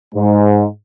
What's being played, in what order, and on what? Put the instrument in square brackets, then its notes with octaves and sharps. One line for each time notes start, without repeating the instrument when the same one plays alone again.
[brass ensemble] G#2